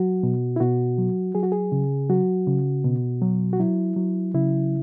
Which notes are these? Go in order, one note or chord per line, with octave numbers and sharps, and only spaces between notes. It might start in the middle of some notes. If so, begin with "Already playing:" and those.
Already playing: F#3 F#4
B2
E4
B2 F#4
F#3
F#3 G#4
F#4
G#4
C#3
F#3 F#4
C#3
B2
F#3
F#4
F#3 E4
F#3
C#3 E4